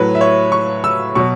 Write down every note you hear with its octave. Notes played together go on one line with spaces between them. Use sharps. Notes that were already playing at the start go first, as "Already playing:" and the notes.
Already playing: A2 F#3 B4
E5
C#5
C#6
E6
B2 F#3 C#6